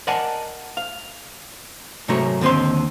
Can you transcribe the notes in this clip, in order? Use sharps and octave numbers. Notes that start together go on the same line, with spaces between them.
A#4 D5 D#5 F#5 G#5 A5
F5
G#2 C3 F#3 A3 A#4 C#5
D#2 D3 C4 D#5 C6